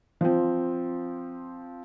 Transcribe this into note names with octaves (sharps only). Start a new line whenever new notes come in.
F3 C4